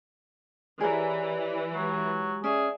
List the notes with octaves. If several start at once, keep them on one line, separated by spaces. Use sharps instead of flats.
E3 G4 G#4 A#4 C#5 D5
F#3 G#3 G4
C#4 G#4 D5 E5